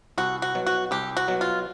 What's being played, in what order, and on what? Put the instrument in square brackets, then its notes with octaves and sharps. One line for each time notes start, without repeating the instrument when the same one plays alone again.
[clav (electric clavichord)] C2 [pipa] F#4
[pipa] F#4
[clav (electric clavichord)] B2 F#3
[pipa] F#4
[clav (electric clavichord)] C2 [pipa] G4
[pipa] F#4
[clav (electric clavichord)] B2 F#3
[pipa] F4